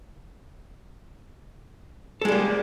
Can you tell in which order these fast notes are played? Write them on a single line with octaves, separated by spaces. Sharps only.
A4 G#3 G3 A#3